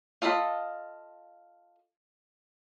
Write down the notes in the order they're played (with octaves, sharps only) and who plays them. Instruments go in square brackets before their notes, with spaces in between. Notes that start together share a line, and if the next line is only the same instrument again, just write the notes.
[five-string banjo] F4 A4 D#5 E5 B5